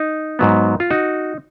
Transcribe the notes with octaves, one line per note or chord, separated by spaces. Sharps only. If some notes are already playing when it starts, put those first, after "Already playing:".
Already playing: D#4
G#2 F#3 B3
F4
D#4 F#4